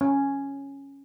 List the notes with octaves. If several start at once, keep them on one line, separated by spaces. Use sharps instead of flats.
C#4